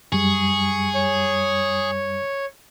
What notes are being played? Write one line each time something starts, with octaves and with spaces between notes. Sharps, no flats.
F#2 G3 G#4 C#6
C#5